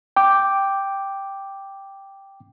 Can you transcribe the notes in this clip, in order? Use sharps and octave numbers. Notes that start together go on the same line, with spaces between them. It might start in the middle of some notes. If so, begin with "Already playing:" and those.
G5 D6